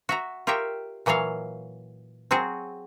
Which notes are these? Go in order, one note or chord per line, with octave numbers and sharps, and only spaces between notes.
F#4 E5 A#5
F4 G4 A#4 C#5 E5 G5
A#2 E3 F#3 C#5 F5
F#3 C4 F#4 G#4